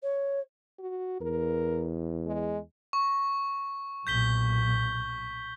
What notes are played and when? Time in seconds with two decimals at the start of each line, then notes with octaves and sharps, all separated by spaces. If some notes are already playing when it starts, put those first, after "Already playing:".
0.03 C#5
0.79 F#4
1.21 E2 A#4
2.26 G#3
2.93 C#6
4.07 B1 A#2 G6 B6 G7